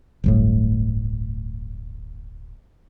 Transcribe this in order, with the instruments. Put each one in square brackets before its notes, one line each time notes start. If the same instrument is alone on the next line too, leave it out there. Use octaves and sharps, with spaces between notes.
[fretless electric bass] D1 G1 A2